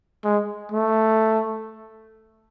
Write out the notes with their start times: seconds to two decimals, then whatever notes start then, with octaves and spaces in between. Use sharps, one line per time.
0.24 G#3
0.71 A3